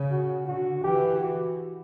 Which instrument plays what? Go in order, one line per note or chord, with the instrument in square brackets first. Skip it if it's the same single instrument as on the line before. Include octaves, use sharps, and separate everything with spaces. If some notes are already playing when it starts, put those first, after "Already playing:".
Already playing: [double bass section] C#3
[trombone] F#4
[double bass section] D3 [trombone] F#4
[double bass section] E3 [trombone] G4
[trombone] F#4